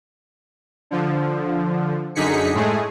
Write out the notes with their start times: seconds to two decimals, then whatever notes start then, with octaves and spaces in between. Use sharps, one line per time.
0.91 D3 F3
2.15 F#2 D3 D#4 G#4 B6 C#7
2.54 A2 G#3 A3 G#4